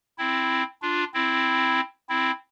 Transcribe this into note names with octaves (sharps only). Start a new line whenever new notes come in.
C4 E4
D4 F4
C4 E4
C4 E4